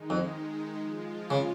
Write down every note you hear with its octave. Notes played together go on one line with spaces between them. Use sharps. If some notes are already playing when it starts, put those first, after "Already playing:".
Already playing: D#3 G#3 D#4
F2
F3 G#3 F4
C#3